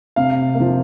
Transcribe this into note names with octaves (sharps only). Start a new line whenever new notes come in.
C3 F5
A#3
F3